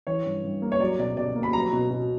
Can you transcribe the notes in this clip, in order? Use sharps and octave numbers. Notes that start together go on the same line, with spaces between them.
E3 C#5
G2
G2
A#3
C#5
F#3 D5
B2 D5
B2 D5
A#3
B5
F#3 A#5
B2
B2